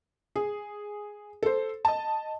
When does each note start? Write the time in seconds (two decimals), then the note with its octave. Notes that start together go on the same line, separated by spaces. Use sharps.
0.36 G#4
1.43 A4 C5
1.85 D#5 A5